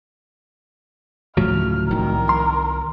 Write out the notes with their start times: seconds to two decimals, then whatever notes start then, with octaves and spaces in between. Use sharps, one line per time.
1.37 D2 A2 C#3 F3 F#3 F6
1.91 C2 D#3 A#4
2.29 C6